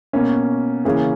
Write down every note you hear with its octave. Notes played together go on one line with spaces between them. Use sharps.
B2 A#3 C#4
C#3 E3 A#3 C#4 G#4